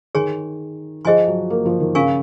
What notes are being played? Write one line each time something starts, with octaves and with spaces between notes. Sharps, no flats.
D#3 G#4 C#5 G#5 C6
F3 G#4 C5 D#5 G#5 C6
F#3
A#3
F3
D#3
C#3 A#4 F5 G#5 C#6